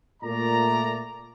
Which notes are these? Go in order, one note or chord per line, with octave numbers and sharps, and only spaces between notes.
A#2 A3 D5 A#5